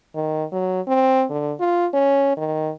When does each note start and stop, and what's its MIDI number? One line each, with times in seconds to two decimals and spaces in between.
0.15 0.45 51
0.52 0.81 54
0.87 1.25 60
1.30 1.54 50
1.60 1.87 65
1.93 2.35 61
2.37 2.72 51